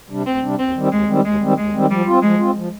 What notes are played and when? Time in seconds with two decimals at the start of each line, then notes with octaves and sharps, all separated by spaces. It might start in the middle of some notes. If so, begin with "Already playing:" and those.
0.10 C3 G3 D4
0.26 D2 C4
0.42 C3 G3 D4
0.59 D#2 C4
0.75 D#3 G3 C4
0.91 D#2 G#3
1.07 D#3 G3 C4
1.24 D#2 G#3
1.41 D#3 G3 C4
1.57 D#2 G#3
1.73 D#3 G3 C4
1.89 F3 G3
2.06 C4 F4
2.22 F3 G#3
2.38 C4 F4
2.55 F3